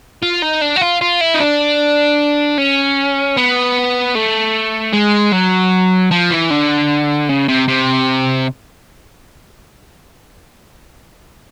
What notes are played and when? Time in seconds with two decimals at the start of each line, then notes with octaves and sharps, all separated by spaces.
0.23 F4
0.42 D#4
0.61 D4
0.76 F#4
0.81 F4
1.01 F4
1.21 E4
1.34 D#4
1.40 D4
2.58 C#4
3.37 B3
4.15 A3
4.93 G#3
5.33 F#3
6.11 F3
6.31 E3
6.50 D3
7.29 C#3
7.48 C3
7.68 C3